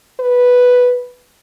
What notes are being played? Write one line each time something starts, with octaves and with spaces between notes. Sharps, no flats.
B4